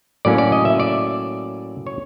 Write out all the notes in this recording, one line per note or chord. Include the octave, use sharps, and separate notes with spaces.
A2 F#3 A#3 C#4 D5
D5
D#5
E5
D5
C#5